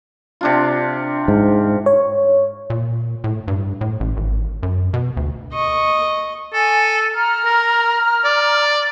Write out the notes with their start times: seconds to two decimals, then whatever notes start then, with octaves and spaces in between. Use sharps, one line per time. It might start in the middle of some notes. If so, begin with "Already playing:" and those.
0.41 C3 D4 F4
1.28 G#2
1.86 C#5
2.70 A#2
3.24 A2
3.48 G2
3.81 A2
4.00 A1
4.17 G#1
4.63 F#2
4.94 B2
5.17 D2
5.54 D#5 C#6
6.53 A4 G#5
7.15 A#5 F6
7.45 A#4
8.25 D5